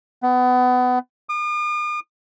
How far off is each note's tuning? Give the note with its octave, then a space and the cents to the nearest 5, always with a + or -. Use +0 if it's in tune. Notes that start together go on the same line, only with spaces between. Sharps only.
B3 +25
D#6 -45